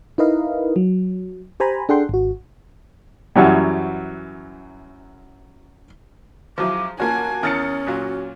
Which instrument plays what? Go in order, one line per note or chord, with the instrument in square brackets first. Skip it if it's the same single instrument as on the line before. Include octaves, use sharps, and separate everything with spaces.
[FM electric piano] D#4 E4 A#4 B4 D#5 F5
F#3
G4 C5 G#5 A#5 B5
D4 G#4 A4 F#5 G5 C6
G#1 F#4
[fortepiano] F#2 E3 F#3 G3
[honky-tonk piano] C#2 F#3 E4 [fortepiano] F3 [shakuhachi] D6
[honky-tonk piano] A#3 F4 F#4 [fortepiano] C#4 [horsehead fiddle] G#5 [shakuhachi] A5
[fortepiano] E2 A#4 [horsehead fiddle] C#4 [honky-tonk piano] D#6 A6 C#7
[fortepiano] A#2 F#3 F4 [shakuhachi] F#4